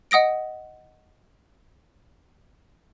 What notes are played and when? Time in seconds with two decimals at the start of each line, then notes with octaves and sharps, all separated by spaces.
0.11 D#5 F#5 D#6 A#6 D7